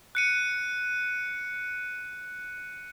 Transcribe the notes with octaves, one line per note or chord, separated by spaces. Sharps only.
F#6 C#7 D#7